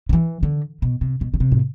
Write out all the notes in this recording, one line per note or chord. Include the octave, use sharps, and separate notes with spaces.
D3
E3
D3
B2
C3
B2
D3
C3
A2